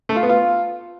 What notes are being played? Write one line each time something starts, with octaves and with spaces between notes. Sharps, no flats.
A3
F4
B3
F4